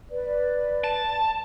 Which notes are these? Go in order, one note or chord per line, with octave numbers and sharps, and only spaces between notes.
B4 D5
A5